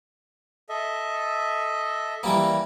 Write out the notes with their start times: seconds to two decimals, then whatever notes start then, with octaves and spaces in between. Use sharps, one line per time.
0.69 A4 D#5 E5
2.23 E3 G3 A#3